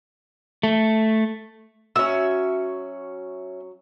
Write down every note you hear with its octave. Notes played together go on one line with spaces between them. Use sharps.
A3
F#3 C#4 F#4 E5 E6